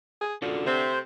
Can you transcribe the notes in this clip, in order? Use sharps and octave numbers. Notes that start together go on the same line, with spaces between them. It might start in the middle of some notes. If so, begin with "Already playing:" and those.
G#4
D3 F4 F#4 A4
C3 A3 C4 C5 E5